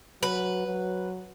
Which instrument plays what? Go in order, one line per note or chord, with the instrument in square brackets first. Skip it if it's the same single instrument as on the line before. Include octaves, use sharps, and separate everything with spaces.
[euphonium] F#3 [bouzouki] B4
[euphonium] F#3